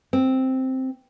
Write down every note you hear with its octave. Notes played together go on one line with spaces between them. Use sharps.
C4